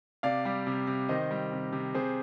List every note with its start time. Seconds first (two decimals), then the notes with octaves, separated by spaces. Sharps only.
0.23 C3 D5 F5
0.45 G3
0.67 C3
0.87 C3
1.09 D#3 C5 D#5
1.31 G3
1.52 C3
1.72 C3
1.95 C3 G#4 C5